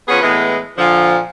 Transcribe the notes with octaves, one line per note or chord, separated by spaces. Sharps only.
F3 B3 C#4 G#4 B4
A2 E3 G#3 B3
A#2 D3 F3